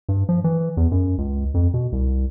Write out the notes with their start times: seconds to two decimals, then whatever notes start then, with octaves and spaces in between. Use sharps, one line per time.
0.09 G2
0.29 F3
0.44 E3
0.77 E2
0.92 F#2
1.18 C#2
1.54 F2
1.74 B2
1.92 C2